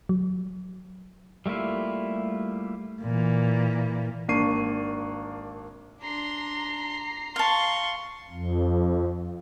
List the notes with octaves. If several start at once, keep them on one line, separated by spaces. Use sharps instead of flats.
F#3
G3 A3 A#3 E4 F4
A#2 E3
G#1 A#3 D4 C#6 C7 D#7
D4 A#5 C6 C7
F5 A5 C6 C#6
F2